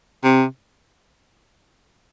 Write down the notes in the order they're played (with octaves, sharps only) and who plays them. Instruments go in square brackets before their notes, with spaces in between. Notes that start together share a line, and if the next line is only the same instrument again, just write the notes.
[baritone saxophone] C3